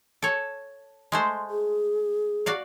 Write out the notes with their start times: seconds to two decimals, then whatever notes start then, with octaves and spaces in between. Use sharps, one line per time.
0.22 A4 C#5
1.12 G#3 A3 C5
1.50 G#4
2.46 F#4 D5 F5